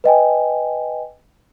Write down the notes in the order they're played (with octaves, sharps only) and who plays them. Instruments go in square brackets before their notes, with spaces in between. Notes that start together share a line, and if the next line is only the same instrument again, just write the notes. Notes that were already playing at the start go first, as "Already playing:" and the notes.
[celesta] B4 D#5 G5 G#5